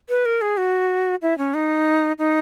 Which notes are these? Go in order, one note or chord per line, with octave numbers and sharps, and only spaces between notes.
B4
A#4
G#4
F#4
E4
C#4
D#4
D#4